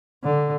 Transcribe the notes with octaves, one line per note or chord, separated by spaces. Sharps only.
D3